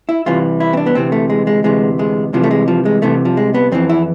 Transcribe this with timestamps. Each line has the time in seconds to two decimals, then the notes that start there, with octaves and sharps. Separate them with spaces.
0.09 E4
0.26 C2 C3 E3 F4
0.60 E4
0.73 C4
0.77 D4
0.86 B3
0.95 D2 C3 E3 C4
1.12 A3
1.30 G#3
1.47 G#3
1.64 D2 C3 E3 G#3
1.99 G#3
2.33 C2 C3 E3 F3
2.43 A3
2.51 G#3
2.68 F3
2.85 G#3
3.02 C2 C3 E3 A3
3.25 F3
3.37 G#3
3.54 B3
3.72 F2 E3 C4
3.89 E4